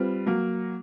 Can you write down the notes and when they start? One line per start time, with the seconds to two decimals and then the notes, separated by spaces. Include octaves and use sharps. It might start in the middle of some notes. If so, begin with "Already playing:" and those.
Already playing: G3 C4 F4 B4
0.27 F#3 A#3